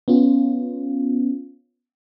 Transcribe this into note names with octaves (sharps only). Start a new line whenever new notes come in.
B3 C#4 F4